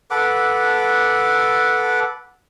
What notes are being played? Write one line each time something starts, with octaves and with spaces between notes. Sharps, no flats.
A4 B4 F#5 D6